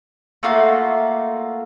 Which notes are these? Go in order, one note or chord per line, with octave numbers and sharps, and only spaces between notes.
A3 A#3 F4 F#4